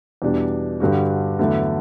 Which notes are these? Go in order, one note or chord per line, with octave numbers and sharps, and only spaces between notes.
E2 B2 G3 D4
G2 D3 G3 D4 F#4
E2 D3 F#3 A3 E4